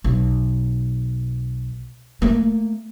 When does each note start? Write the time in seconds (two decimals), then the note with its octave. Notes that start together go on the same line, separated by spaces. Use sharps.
0.04 B1
2.22 A3 A#3